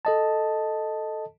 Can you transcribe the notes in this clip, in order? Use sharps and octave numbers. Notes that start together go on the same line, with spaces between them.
A4 D#5 A5